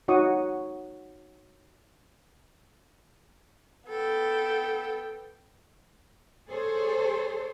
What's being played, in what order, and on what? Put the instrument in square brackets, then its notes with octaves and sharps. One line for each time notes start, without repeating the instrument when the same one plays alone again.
[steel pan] D#4 F#4 C#5 C#6 D#6
[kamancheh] B3 G5 [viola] A4
[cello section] G#4 A4 C5 C#5